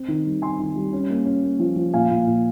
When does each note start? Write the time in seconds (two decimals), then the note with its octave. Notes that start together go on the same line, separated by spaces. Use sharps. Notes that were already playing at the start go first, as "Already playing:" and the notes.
Already playing: C4
0.08 D#3
0.25 G3
0.42 C4 G#5 C6
0.59 D#3
0.76 G3
0.93 C#4
1.10 A#3
1.26 C#4
1.44 A#3
1.59 F3
1.76 F3
1.94 A#2 F5 G#5
2.10 A#2
2.27 A#2